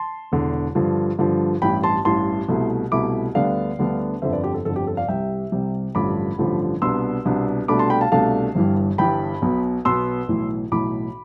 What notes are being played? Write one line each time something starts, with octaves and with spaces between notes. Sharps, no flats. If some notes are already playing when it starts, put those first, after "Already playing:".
Already playing: A5 C6
E1 E2 D3
G2 D3 F3
G2 D3 F3
A1 G2 E3 G5 B5
A5 C6
A1 G2 E3 A5 C6
C2 B2 A3 E4
C2 B2 A3 E4 B5 D6
D2 D3 G3 B3 D4 D5 F5
D2 D3 G3 B3 D4
G1 F2 D3 C5 E5
B4 D5
G4
A4
G1 F2 D3 A4
G4
A4
D5 F5
C2 C3 G3 E5 G5
C2 C3 G3
A1 G2 D3 F3 B5 D6
A1 G2 D3 F3
C2 B2 B3 D4 C6 E6
C2 B2 B3 D4
C2 B2 A3 D4 B5 D6
A5 C6
G5 B5
F5 A5
C2 B2 A3 D4 F5 A5
G1 G2 E3 G3
G1 G2 E3 G3 G5 B5
B1 B2 B3
B1 B2 B3 C6 E6
B1 A2 E3
B1 A2 E3 B5 D6